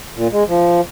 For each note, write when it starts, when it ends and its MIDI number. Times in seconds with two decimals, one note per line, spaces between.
0.16 0.28 46
0.31 0.43 56
0.47 0.81 53